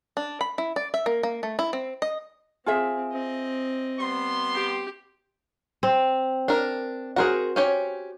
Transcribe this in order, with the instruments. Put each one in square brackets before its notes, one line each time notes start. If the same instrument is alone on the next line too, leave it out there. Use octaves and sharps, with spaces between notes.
[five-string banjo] D4
B5
E4
D5
E5
A#3
A#3
A3
E4
C4
D#5
[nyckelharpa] C4 [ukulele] F4 G#4 E5
[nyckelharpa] C4 D#5
[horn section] G3 B3 C6
[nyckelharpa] G4
[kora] C4
[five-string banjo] D4 A#4
[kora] F#4 C5 [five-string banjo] G#4 A#4 F#5
[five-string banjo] C#4 G4 C#5